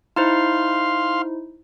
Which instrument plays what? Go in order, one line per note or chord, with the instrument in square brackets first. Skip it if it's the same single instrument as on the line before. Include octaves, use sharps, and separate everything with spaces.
[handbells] D#4 E4 C5 [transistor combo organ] F5 C6